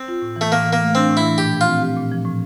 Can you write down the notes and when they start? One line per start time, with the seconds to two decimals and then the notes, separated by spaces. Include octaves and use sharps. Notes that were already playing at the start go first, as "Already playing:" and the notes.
Already playing: C4
0.08 F4
0.22 A2
0.36 E3 A3
0.52 A2 A#3
0.65 E3
0.73 A#3
0.80 A3
0.95 C4 D4
1.10 A2
1.17 E4
1.23 E3
1.38 A#2 G4
1.53 F3
1.61 F4
1.67 C4
1.82 G4
1.97 A#2
2.11 F3
2.25 A2